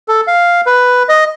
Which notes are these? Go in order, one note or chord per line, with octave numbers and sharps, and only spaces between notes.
A4
F5
B4
D#5